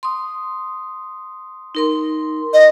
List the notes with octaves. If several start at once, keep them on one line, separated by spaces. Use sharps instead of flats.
C6 D#6
D#4 A#4 C6
D#5